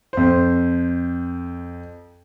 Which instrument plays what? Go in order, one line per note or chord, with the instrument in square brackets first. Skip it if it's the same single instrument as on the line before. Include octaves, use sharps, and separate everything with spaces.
[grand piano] F2 C5